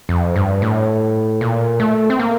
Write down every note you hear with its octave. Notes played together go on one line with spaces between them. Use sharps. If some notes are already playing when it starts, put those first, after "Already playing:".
F2
G2
A2
A#2
A3
C4
A#3